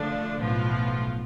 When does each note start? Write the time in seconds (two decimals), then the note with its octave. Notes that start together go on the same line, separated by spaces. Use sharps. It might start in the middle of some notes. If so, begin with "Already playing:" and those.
Already playing: D3 F3 A3 D4
0.37 B1 A2 F3 B3 F4